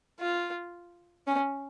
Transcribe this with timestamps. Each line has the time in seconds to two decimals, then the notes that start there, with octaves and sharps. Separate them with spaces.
0.21 F4
1.27 C#4